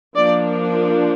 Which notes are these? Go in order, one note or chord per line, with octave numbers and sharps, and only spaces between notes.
F3 A#3 D4 D5